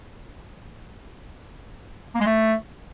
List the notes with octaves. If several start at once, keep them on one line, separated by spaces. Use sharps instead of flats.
A#3
G#3
A3